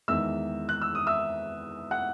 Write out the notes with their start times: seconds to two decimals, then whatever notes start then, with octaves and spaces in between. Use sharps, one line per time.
0.08 E2 D#3 G#3 E5 E6
0.69 F#6
0.82 E6
0.95 D#6
1.07 E5 E6
1.91 F#5 F#6